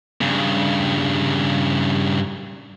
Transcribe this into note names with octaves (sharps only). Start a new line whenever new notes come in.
G2 C#3